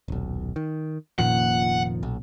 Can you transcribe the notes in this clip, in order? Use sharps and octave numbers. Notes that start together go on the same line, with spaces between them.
D#1 B1
D#3
F1 A#2 D#3 F3 C#4 F#5
B1